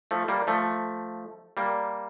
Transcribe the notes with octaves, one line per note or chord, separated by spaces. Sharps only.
F3 A3
G3 A#3
F3 A3
G3 A#3